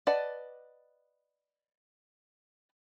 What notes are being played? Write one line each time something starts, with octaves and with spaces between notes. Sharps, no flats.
B4 D5 D#5 F#5 A5